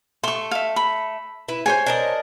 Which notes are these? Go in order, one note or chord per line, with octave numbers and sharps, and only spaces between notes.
A3 C6 C#6
E5 F5
B5
E4 B4
G#4 C5 C#5 G#5
D4 A#4 D#5